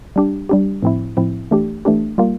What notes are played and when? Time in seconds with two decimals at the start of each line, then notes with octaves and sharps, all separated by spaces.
0.16 G3 D4 G4
0.49 G3 D4 G4
0.83 A2 F3 C4 E4
1.17 A2 F3 C4 E4
1.51 E3 A3 D4 G4
1.85 E3 A3 D4 G4
2.18 G3 A#3 F4